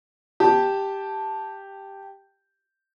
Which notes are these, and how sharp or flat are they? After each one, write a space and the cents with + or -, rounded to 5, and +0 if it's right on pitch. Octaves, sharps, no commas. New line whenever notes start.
G4 +0 A5 +0